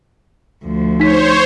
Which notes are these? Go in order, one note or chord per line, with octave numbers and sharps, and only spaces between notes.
D2 F3
D#4 C5 C#5 B6